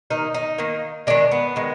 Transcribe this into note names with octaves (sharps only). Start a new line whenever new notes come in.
D#3 A#3 D#4
D#4
D#3 A#3
D#3 G#3 D4
B3
D#3 G#3